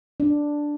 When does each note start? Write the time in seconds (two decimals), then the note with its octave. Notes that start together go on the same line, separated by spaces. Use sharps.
0.20 D4